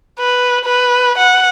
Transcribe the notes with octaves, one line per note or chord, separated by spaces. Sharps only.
B4
B4
F#5